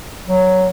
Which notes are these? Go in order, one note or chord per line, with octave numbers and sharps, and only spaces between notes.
F#3